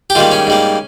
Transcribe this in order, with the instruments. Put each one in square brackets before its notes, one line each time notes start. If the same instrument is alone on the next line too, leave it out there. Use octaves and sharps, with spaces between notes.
[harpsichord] G4
G#2 D#3 G3 A#3 F4
C#4
G#2 G3 A#3